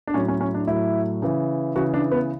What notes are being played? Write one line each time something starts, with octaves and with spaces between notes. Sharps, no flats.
D4
A2 F#3 C#4
C#4
C#4
D4
A2 F#3 E4
C#3 E3
C#3 E3 F#4
D4
B3